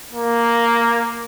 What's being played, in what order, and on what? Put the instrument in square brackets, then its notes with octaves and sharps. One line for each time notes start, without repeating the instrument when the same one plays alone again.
[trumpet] A#3